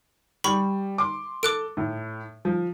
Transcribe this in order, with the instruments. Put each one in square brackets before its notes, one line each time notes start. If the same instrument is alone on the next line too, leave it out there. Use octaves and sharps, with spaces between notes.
[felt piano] G3 [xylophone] B5 C#6
[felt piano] C6 D6
[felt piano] A4 [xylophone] D6 F#6 D7
[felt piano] A2
F3